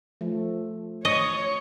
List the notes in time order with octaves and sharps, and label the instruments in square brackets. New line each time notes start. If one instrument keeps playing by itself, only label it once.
[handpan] F3 A3
[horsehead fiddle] C#5 [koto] D#5 [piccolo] C#6